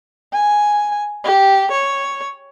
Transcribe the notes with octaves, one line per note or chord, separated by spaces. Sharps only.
G#5
G4
C#5